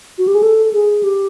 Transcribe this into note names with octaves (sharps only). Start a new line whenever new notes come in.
F#4
G4
G#4
A4
G#4
G4